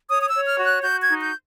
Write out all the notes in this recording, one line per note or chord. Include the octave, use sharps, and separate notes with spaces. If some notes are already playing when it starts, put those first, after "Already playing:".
C#5 D#6
D#6
E6
C#5
F6
F#4
F#6
F#4 G6
G#6
D#4
G6